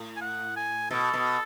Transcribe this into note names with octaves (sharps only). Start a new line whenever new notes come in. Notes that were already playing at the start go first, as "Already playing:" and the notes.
Already playing: A2
G#5
F#5
G#5
B2 A4
B2